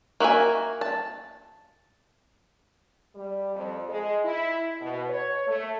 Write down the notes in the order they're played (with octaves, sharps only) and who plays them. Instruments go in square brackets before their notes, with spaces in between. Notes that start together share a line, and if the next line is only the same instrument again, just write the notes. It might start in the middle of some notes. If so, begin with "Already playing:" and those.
[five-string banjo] A#3 F#4 E5 G#5
A5
[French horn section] G3
F2
G#3
E4
B2
C#5
A3